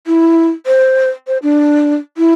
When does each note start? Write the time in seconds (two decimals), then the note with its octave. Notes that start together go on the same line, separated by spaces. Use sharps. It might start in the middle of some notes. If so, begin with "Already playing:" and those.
0.07 E4
0.66 C5
1.27 C5
1.43 D4
2.17 E4